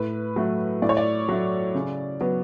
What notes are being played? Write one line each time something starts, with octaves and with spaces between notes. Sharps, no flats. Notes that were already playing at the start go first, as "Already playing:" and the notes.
Already playing: A2 B4
F#3 A3
A2 D5
C#5
D5
F#3 A3
C#3
F#3 B3